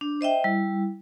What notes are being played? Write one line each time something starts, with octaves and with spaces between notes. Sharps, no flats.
D4
C5 D#5 E5 G5
G3 E4